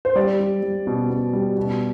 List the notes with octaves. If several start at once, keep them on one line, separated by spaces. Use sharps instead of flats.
C5
G3 D5
G3
G3
B2
B2
G3
B2